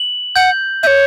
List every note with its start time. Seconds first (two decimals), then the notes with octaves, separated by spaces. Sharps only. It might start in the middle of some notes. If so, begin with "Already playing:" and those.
Already playing: F#7
0.36 F#5 G6
0.83 C#5 E5 G6